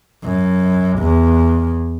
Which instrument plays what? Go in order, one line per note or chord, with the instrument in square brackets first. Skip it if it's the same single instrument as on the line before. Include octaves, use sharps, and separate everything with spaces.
[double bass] F#2
E2